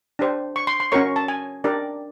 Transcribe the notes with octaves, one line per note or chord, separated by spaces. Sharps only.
D4 G4 C5
C#6
C6
C6
C#4 F#4 A#4 C#5 C#6
A5
G#5
D4 G4 A#4 D5